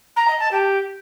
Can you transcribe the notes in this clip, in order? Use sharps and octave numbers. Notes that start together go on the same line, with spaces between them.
A#5
D#5
A5
G4